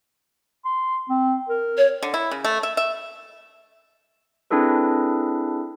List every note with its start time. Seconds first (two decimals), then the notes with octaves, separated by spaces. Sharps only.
0.65 C6
1.10 C4
1.49 A#4
1.77 C#5
2.03 D3
2.14 E4
2.31 C#3
2.44 A3
2.63 E5
2.77 E5
4.51 C4 D4 E4 G#4 A4 B4